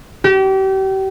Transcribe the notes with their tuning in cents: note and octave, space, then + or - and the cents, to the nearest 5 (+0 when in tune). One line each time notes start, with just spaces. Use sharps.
G4 -35